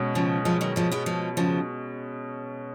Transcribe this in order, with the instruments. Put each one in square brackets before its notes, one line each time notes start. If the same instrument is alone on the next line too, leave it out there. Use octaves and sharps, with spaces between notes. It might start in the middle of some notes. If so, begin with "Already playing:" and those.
Already playing: [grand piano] B2 G#3 C#4
[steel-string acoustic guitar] C#3 F3
F3 G#3
D#3 F#3
F3 G#3
G#3 B3
F3 G#3
C#3 F3